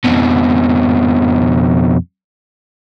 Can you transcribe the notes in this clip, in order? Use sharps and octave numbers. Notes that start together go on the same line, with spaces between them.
F2 B2